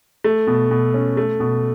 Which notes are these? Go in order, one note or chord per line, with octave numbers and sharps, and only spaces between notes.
A3
B2
B2
C#4
A3
B2